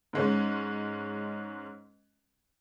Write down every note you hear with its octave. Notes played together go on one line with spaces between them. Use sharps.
G#2 G#3 C#4